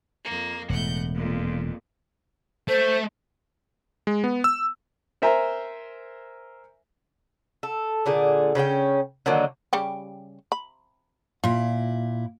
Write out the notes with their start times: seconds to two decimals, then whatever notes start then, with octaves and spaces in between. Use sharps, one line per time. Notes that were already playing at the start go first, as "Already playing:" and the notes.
0.23 F2 A#3
0.69 E1 A2 F#5 G6
1.15 F2 A#2
2.68 A3 C5
4.07 G#3
4.24 B3
4.44 E6
5.22 A#4 C5 E5 G#5 A#5
7.63 A4
8.06 A#2 D3 G#4
8.55 C#3 C#4 F#4 G5
9.26 D3 D#3 F#3 A#3
9.73 C#3 G3 G4
10.52 B5
11.44 A#2 E4 F4